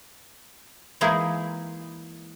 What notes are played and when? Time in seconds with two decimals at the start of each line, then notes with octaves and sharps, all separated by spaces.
1.01 E3 G#3 A#3 D#4 E4 G#4